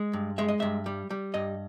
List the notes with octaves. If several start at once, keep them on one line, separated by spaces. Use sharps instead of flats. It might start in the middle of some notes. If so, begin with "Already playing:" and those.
Already playing: G#3
G2
G#3 E5
D#5
G2 E5
G3
G3
G2 D#5